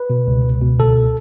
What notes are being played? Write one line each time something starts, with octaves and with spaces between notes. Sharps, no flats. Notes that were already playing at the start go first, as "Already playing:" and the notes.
Already playing: B4
B2
C#2
C#2
B2
D2 A4